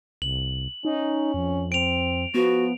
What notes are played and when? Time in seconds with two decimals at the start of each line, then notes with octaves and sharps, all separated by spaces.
0.22 C2 F#7
0.85 C#4 D#4
1.34 F2
1.72 C4 D7 F7
2.34 F3 B3 F#4